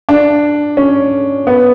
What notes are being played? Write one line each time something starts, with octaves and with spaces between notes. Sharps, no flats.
D4
C#4
B3